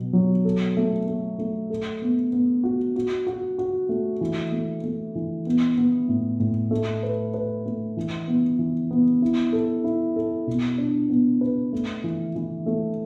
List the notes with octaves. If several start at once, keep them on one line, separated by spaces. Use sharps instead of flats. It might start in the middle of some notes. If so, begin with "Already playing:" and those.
Already playing: B2 F#3 B3
F#3
A4
A3
A3
A3
A4
B3
B3
F#4
F#4
F#4
F#4
A3
E3
A3
A3
E3
B3
B3
A2
A2
A3
B4
B4
A3
E3
B3
E3
B3
E4
A4
E4
A4
B2
D4
B3
B4
A3
E3
E3
A3